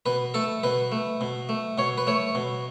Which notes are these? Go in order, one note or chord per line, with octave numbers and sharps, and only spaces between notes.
B2 B4
A3 A4
B2 B4
A3
B2
A3
B2 C#5
B4
A3 C#5
B2